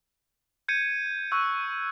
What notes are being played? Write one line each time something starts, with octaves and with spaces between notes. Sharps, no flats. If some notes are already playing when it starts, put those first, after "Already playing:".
G6 G#6 C#7 D#7
C#6 E6 F#6 C#7